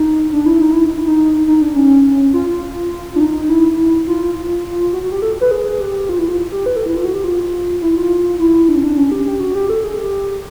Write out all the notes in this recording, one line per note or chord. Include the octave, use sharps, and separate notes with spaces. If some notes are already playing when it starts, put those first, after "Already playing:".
Already playing: D#4
D4
E4
D#4
E4
D#4
E4
D#4
D#4
D4
C#4
F4
F4
D4
D#4
E4
F4
F#4
F#4
G4
A4
B4
G#4
G4
F4
E4
F4
G4
B4
A4
E4
F4
F#4
G4
F4
E4
F4
E4
D4
C#4
D4
C#4
G4
G4
F#4
G4
A4
G#4
G4